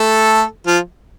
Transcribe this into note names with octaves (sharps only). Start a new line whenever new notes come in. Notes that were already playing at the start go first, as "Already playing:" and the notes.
Already playing: A3 A4
F3 F4